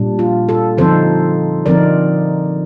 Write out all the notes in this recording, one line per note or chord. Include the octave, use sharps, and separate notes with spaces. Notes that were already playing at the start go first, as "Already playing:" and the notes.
Already playing: A#2 G3 D4
F4
F4 A4
D3 F3 C4 D#4 A4 C5
D3 F3 C4 D#4 A#4 D5